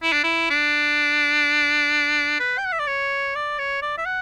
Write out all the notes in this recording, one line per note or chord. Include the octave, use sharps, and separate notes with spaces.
E4
D4
E4
D4
B4
G5
F#5
E5
D5
C#5
D5
C#5
D5
E5
F#5